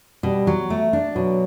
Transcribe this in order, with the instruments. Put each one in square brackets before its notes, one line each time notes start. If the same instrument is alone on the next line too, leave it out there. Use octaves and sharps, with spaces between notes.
[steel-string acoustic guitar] B2 [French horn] G3
[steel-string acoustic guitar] F#3
A3
D4
[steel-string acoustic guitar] B2 [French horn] F#3